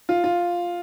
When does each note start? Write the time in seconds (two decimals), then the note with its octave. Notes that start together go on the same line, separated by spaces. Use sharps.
0.09 F4
0.24 F4